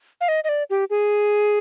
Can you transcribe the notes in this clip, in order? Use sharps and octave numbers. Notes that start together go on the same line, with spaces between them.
F5
D#5
D#5
D5
G4
G#4